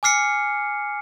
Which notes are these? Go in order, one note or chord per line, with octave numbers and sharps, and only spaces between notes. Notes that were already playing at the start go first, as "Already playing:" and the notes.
G#5 D6 F6 C7 C#7